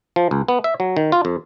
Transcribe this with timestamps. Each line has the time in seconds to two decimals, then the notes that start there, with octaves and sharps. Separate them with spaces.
0.16 F3
0.31 C#2
0.48 B3
0.64 E5
0.80 F#3
0.97 D#3
1.12 F4
1.25 F2